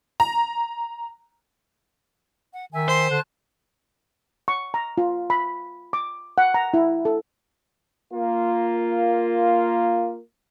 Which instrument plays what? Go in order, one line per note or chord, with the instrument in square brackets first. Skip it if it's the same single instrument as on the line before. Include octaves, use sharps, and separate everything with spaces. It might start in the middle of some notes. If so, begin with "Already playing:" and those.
[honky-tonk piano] A#5
[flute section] F#5
[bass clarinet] D#3 [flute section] E5 G#5
[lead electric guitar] C5 [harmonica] C6
[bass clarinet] D3 [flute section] A5 F#6
[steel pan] C#6
A#5
F4
B5
D6
F#5
A#5
E4
A4
[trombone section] A#3 F4